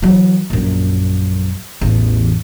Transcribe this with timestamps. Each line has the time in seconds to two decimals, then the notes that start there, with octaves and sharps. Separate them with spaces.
0.02 E3 F#3
0.50 A#1 F#2
1.81 A1 E2